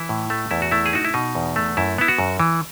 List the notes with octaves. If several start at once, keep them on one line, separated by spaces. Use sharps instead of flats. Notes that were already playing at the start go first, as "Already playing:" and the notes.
Already playing: E3 E4
A2
A3
E2 E4
F#4
A3 E4
G#4
D#4 F#4
E4
B2 D#4
E2
A3
F#2 E4
B3 E4
F#4
F#2
E3